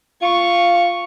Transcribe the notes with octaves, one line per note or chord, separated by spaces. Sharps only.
F4 C#6